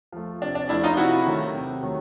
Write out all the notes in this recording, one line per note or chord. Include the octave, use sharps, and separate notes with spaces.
F3 A3
C3 D4
D4
F3 A3 D4 E4
D#4 F4
C3 E4 F#4
D#3 F#3 A3
C3
D#3 F#3 A3